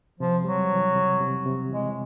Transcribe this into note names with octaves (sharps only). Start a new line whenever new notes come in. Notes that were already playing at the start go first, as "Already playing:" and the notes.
C3 F3
F#3 G3
E3
C3
C3
C3
E3 G#3